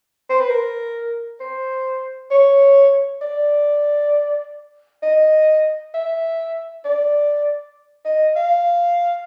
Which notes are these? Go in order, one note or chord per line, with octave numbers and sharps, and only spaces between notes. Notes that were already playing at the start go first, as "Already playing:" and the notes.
C5
B4
A#4
C5
C#5
D5
D#5
E5
D5
D#5
F5